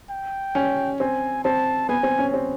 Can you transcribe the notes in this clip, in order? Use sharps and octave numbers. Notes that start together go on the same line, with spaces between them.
G5
C#4
C4 G#5
C4 A5
B3 G#5
C4
C#4
C4